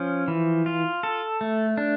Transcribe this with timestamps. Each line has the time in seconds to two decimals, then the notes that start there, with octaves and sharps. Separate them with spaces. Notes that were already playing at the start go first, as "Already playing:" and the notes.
Already playing: F3 C#4
0.28 E3
0.66 F4
1.03 A4
1.41 A3
1.77 D4